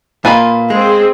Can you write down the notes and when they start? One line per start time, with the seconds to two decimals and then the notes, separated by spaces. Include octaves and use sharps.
0.25 A#2 A#3 F4 B4 G#5 B5
0.70 G#3 C4 G#4